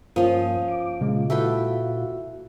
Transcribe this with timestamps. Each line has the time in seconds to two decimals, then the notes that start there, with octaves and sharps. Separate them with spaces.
0.16 G2 F3 A#3 C#4 D#6
0.68 D6
1.01 A#2 C#3 G#3 F4
1.30 E4 F#4 A4 B4 E5 G5